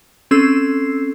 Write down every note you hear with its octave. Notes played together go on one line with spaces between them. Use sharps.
C4 C#4 A4 E6 C7